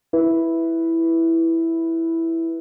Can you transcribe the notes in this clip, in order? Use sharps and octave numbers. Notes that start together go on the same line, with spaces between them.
E4 B4